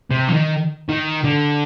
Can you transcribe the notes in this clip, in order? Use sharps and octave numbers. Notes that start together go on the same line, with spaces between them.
C3
F3
D#3
D#3
D3